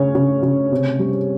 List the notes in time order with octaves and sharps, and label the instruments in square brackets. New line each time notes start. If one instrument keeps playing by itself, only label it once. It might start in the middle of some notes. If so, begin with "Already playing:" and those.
Already playing: [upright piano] C#3 C#5
C#3
C#3
C3
G3